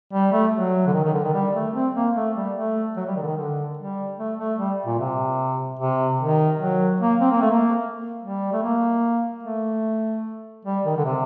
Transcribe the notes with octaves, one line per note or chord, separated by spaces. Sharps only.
G3
A3
F#3
D3
D#3
D#3
D3
D#3
G3
A3
C4
A#3
A3
G3
A3
F#3
G3
D#3
D3
D#3
D3
G3
A3
A3
G3
A#2
C3
C3
D#3
F#3
A#3
C4
A#3
A3
A#3
G3
A3
A#3
A3
G3
D#3
D3
C3